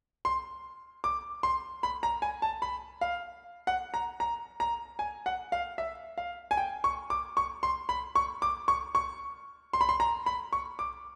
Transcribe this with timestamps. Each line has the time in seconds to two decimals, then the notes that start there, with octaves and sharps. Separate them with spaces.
0.25 C6
1.04 D6
1.43 C6
1.83 B5
2.03 A#5
2.22 G#5
2.42 A5
2.62 B5
3.01 F5
3.67 F#5
3.94 A#5
4.20 A#5
4.60 A#5
4.99 G#5
5.26 F#5
5.52 F5
5.78 E5
6.18 F5
6.51 G#5
6.57 G5
6.84 C#6
7.10 D6
7.37 C#6
7.63 C6
7.89 B5
8.16 C#6
8.42 D6
8.68 C#6
8.95 C#6
9.73 C6
9.81 B5
9.89 C6
10.00 A#5
10.26 B5
10.53 C#6
10.79 D6